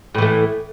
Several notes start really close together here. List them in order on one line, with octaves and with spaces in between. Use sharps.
A2 E3 A3